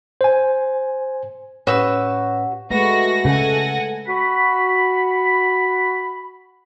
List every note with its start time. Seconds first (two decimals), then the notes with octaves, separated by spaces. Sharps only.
0.21 C5 G#5
1.67 A2 C#4 F#4 G4 B4 C#5 E6
2.71 G#3 A3 F#4 B4 A#6
3.25 C#3 A4 F#5 G#5
4.07 F#4 B5